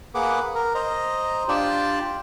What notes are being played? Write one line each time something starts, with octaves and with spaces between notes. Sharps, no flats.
A#3 G#4 B4 F#5 D6
A#4
C5 D#5 A#5
D4 F4 G4 D5 G5 A5